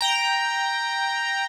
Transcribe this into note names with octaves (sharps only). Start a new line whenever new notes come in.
G5 A#5